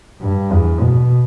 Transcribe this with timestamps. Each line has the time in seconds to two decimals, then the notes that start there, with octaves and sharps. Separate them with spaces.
0.21 G2
0.52 E2
0.81 B2